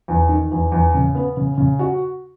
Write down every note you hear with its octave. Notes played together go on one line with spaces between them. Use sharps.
E2
D#3
E2
E2
C#3
B3
C#3
C#3
F#4